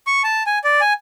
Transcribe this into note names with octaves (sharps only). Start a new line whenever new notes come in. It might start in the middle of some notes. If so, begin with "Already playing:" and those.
C#6
A5
G#5
D5
G#5